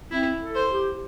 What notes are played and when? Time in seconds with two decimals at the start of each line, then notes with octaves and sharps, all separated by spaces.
0.11 C4 E4
0.41 A4
0.55 C5
0.70 G4